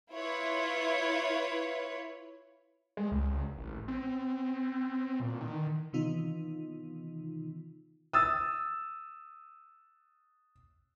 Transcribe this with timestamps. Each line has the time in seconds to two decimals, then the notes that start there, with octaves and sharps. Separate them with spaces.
0.13 E4 F4 B4 C#5
2.97 G#3
3.11 C#2
3.58 A1
3.88 C4
5.20 A#2
5.41 D#3
5.93 C3 D#3 E3 B3 D#4 F4
8.13 D#6 E6 A6